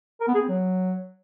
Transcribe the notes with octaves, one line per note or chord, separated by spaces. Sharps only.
A#4
B3
G#4
C4
F#3